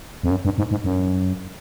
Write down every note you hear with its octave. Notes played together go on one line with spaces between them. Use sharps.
F2
F#2
G2
G#2
G#2
F#2